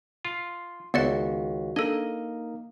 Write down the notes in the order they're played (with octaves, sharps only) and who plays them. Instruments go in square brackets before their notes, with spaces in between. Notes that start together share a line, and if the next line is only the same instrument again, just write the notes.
[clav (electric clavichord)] F4 [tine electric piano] C6
[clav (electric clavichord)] C#2 [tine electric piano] D#3 F#4 [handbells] B3 D5 F#5
[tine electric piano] A#3 D#4 [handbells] D4 A4 [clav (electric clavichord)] D#5